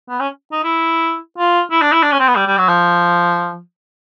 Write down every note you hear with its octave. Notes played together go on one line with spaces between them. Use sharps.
B3
C#4
D#4
E4
F4
E4
D4
E4
D4
C#4
C4
B3
G3
G3
F#3
F3